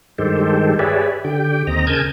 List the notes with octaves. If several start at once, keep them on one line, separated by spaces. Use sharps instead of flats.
G2 D#3 G#3 G4 A4 C5
G4 G#4 B4 C#5 D5 E5
D3 G4 G5
D#2 C4 D#5 A#5
C#3 A#4 G#5 A5 G6 G#6